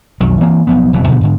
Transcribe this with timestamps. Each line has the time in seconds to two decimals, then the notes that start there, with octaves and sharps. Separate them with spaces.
0.20 B1 F2 D#3 F#3
0.41 E3 A#3 C4
0.67 B1 F3 B3
0.93 F#1 F2 B2 E3
1.07 B2 D3 F3 B3
1.21 G#2 D3